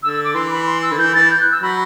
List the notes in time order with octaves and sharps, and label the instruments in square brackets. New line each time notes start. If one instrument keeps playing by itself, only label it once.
[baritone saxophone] D3 [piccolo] E6
[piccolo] E6
D6
[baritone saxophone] E3 [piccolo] C6
[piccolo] B5
C6
E6
[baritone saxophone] D3
[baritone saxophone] E3 [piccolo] G6
[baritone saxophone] E3 [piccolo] A6
[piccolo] G6
F#6
E6
[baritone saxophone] F#3 [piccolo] B5